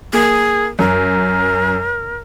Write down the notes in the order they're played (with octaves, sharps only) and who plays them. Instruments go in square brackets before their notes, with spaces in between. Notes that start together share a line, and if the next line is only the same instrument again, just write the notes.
[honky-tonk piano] A#3 [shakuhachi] G#4
[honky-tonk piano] F#2 [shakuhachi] A#4